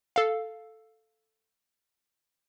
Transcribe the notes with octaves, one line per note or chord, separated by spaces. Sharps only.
A4 F5